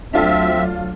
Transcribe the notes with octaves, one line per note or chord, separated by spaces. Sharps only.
D2 F#3 C4 D4 F4 A4 E5